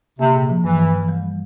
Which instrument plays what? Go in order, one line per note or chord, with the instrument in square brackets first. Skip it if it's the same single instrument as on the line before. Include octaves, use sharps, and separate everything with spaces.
[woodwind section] C3 [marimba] A#3
[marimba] A#2
F3
[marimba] G2 [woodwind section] E3
[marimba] G2
E3
G3